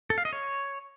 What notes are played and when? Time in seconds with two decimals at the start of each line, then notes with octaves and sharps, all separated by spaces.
0.10 A4
0.18 F5
0.25 D#5
0.33 C#5